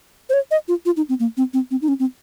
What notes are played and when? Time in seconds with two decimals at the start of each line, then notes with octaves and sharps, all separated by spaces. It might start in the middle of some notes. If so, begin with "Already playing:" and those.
0.29 C5
0.33 C#5
0.51 D#5
0.68 F4
0.86 F4
0.97 D#4
1.09 C4
1.20 A#3
1.37 C4
1.54 C4
1.71 C4
1.82 D#4
1.88 C#4
2.00 C4